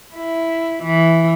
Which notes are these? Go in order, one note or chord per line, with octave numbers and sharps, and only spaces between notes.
E4
E3